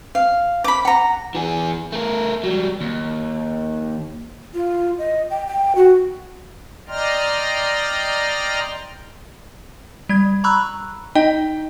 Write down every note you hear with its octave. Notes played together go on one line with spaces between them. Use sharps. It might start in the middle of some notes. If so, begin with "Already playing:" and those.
F5
B5 D6
F#5 A#5
E3 G#4
A3 A#4
F#3 G3
D#2
F4
D#5
G5
G5
F#4
D5 D#5 G5 A#5 C6 F6
G3 G#6
A#5 B5 C#6 E6 F#6
D#4 D#5 G5